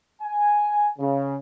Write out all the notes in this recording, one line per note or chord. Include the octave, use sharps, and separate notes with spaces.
G#5
C#3